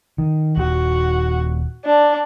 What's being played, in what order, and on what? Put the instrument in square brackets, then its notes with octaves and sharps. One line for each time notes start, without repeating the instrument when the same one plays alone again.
[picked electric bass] D#3
[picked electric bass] D#1 [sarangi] F#4
[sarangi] D4